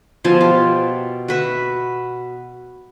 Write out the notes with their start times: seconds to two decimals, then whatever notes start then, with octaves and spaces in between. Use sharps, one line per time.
0.24 B2 F3 G#5 A5
0.41 F4 G4
1.28 F#4 B4 E5